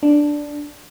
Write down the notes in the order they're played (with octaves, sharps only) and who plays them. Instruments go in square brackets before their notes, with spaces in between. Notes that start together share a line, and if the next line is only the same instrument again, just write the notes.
[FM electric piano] D4